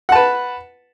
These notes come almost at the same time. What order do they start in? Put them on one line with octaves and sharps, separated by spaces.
F#5 A5 B4